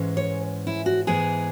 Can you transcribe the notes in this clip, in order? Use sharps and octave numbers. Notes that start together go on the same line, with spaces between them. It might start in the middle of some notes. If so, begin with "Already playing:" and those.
Already playing: G#2 E3 G#3 C#4
C#5
E4
F#4
G#2 E3 G#3 B3 G#4